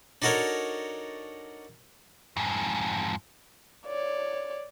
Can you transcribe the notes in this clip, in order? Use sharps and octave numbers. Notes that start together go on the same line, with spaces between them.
D4 D#4 F#4 A4 A#4 C#5
F2 G#2
C#5 D5